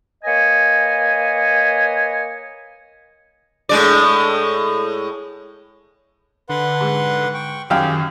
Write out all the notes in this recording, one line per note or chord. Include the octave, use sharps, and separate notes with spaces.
A#3 B4 C#5 D#5 G#5
A2 G#3 D5
D3 B4 F#5 C6
G#2
G5 C#6
F#2 D#3 G4 G#4 F5 G5